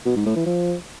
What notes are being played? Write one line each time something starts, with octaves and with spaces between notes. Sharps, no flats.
B2
G#2
A2
E3
F3